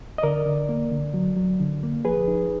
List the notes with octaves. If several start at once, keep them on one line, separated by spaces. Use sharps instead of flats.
D#5
D3 A#4 D5
D3
A#3
D3
F#3
F#3
D3
A#3
F3 G#4 B4
D#4